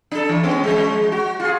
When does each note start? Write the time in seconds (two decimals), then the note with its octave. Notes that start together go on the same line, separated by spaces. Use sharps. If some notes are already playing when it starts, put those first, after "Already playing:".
0.11 D4 A4
0.29 E3
0.43 G#3 B3 C#4
0.63 F3 G#3
1.12 F#4
1.40 F4 G#4